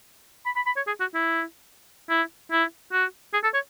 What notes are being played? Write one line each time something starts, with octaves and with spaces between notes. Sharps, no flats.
B5
B5
B5
C#5
G#4
F#4
E4
E4
E4
F#4
G#4
A4
C#5